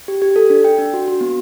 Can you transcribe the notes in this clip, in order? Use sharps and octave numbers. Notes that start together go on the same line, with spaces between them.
G4
G4
A4
D4
G5
D4
F#4
F#4
B3